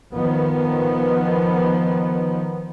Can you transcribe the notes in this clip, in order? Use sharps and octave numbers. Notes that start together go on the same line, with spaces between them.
D#3 F3 B3